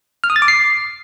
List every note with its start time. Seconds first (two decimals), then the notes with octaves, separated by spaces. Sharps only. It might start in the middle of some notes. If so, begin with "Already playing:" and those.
0.24 F6
0.30 D#6
0.36 A6
0.42 D6
0.48 C7